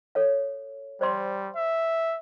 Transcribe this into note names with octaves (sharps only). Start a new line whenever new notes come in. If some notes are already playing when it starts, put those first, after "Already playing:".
A4 C#5 F5
G3 C5 D5 C6
E5